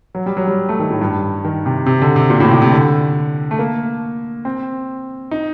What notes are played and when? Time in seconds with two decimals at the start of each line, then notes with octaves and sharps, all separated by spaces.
0.15 F#3
0.26 G3
0.37 F#3
0.47 G3
0.69 A3
0.80 D#3
0.91 A2
1.01 G2
1.45 D#3
1.66 C3
1.86 C3
2.02 D3
2.16 C3
2.30 A#2
2.40 A2
2.51 C3
2.62 C3
2.72 D3
3.51 A3
3.59 A#3
4.45 C4
5.31 D#4